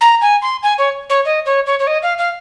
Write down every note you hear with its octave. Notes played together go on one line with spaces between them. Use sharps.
A#5
G#5
C6
G#5
C#5
C#5
D#5
C#5
C#5
C#5
D#5
F5
F5